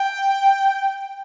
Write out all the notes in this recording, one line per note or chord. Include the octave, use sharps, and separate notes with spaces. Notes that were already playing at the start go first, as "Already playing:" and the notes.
Already playing: G5